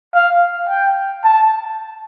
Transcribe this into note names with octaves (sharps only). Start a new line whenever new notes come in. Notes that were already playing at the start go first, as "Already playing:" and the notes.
F5
G5
A5